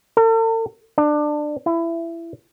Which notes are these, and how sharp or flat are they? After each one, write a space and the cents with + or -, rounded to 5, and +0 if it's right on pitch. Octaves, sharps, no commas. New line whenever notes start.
A4 +45
D4 +20
E4 +20